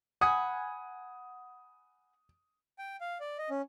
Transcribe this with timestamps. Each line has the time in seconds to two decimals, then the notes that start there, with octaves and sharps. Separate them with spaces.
0.21 F#5 G#5 B5 D#6
2.78 G5
3.01 F5
3.20 D5
3.38 D#5
3.50 C#4